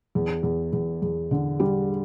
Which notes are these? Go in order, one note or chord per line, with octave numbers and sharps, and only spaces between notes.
E2
E2
E2
E2
D3
G3